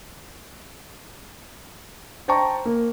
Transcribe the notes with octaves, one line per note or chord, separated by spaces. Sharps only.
C5 G5 A5 A#5 C#6
A#3